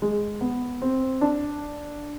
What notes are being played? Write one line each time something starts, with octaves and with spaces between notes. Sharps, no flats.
G#3
B3
C4
D4